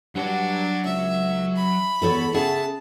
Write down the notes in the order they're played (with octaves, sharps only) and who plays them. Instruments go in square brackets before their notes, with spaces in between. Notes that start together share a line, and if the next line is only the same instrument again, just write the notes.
[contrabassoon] G2 [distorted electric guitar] F#3 F#5 [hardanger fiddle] D4
[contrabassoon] C#2 [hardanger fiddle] E5
[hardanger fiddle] B5
[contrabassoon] E2 [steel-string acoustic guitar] B3 A4 C#5
[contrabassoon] C#3 [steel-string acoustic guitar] G#4 E5 F#5 [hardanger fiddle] A5